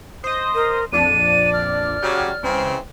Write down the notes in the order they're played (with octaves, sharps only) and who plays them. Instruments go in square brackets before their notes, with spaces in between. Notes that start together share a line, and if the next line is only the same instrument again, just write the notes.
[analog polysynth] C5 D#5 [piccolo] D#6
[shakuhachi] A#4
[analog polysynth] A#1 F2 D4 [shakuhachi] D5 [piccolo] D#7
[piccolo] F6
[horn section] C#3 F#3 [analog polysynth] G4
[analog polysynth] C#2 [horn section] C#3 E3 C4